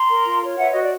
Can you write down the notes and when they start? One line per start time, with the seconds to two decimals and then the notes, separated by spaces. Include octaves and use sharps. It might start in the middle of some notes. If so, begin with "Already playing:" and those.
Already playing: A#5 C6
0.10 A#4
0.26 F4
0.42 C#5
0.57 B4 E5 F#5
0.73 F#4 D#5
0.82 D5